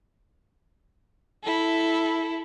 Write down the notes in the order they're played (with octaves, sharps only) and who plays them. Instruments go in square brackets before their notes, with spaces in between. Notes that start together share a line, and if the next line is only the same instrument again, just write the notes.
[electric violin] E4 A4